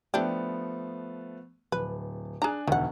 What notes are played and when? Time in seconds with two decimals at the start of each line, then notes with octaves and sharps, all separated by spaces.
0.14 F3 A3 B3 D4 E4 G4
1.72 D1 B4
2.42 D4 G#4 G#5 A#5 F#6
2.68 E1 D2 D#3 F#5